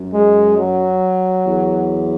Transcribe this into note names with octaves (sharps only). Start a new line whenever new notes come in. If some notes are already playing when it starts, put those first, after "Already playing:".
Already playing: F#2
G#3
F#3
E2